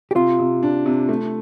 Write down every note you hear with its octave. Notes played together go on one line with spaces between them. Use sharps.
G4
C3 F4
C3
D4
C3
A3